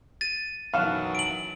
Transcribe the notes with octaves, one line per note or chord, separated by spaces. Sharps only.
A6 D#7
F#2 B2 D#3 E3 F#3 A4 F5 F#6
D7 F#7